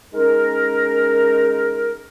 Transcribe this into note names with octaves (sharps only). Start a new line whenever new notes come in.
G#3 C#4 D#4 A#4